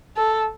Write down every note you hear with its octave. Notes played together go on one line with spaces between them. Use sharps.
A4